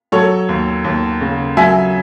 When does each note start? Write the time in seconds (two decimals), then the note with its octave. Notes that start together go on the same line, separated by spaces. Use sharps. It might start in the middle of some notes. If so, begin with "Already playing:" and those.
0.12 F#3 A4 C#5
0.49 D#2
0.84 D#2
1.21 C#3
1.57 F#3 E5 G#5